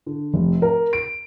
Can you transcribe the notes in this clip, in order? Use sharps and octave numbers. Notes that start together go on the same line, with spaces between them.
D3
F1
A#4
D7